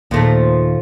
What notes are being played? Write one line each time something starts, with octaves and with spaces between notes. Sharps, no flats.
D#2 A#2 F3 A3